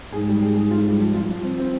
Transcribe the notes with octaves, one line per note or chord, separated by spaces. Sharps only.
G#2 G#4
G3
G#4
G#4
F4
G3
F3
F4
F3
C4
C4